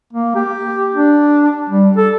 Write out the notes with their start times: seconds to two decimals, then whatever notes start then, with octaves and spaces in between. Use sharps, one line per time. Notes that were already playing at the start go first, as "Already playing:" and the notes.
0.13 A#3
0.36 G4
0.95 D4
1.70 G3
1.97 A4